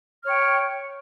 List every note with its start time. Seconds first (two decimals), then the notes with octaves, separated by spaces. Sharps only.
0.23 F6
0.25 C#5
0.28 G5